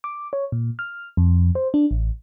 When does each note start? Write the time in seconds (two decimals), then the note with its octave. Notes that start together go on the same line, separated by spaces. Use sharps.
0.04 D6
0.33 C#5
0.52 A#2
0.79 F6
1.17 F2
1.55 C5
1.74 D4
1.91 A1